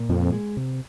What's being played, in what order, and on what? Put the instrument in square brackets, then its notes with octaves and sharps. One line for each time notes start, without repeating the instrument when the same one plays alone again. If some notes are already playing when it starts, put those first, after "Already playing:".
Already playing: [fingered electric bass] A#2
[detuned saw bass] F2 [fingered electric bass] F3
[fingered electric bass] G#3
C3